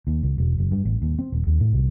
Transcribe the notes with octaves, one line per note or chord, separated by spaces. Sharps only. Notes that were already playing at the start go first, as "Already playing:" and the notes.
D#2
C#2
E1
F#1
G2
A1
D#2
C4
D#1
D#2
A2
C2